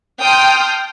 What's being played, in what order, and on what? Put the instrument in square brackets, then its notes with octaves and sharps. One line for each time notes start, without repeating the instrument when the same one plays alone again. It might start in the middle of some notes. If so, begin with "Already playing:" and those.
[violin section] G5 A5 C6 D#6 F6 G6